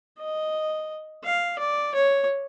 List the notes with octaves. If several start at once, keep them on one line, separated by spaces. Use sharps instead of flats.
D#5
F5
D5
C#5